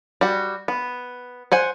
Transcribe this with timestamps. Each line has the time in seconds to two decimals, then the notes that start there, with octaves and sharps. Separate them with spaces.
0.21 G3 F#4
0.68 B3
1.52 C5 F#5 G#5